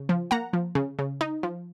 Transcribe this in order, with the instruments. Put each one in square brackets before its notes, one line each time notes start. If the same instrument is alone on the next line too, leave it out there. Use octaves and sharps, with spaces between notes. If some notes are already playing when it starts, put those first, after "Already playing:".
Already playing: [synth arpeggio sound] C#3
F3
A#3 F#5 A#5
F3
C#3
C#3
D#4
F3